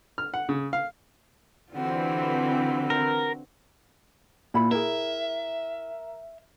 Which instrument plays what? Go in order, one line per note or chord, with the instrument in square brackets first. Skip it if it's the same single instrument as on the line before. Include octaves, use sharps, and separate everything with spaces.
[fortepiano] F6
F#5
C#3
F5
[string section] D3 E3 C4 [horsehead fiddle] F4 F#4
[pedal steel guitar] A#4
[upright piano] A#2 [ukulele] E4 B5
[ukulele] E4 G#4 [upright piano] A#4 [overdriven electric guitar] E5